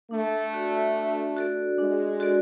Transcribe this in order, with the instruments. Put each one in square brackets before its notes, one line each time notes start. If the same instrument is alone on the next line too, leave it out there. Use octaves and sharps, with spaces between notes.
[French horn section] A3 [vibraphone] D4
[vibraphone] F#4 A4 D5
D4
F#4 A4 D5
[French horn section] G#3 [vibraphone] D4
[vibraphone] F#4 A4 D5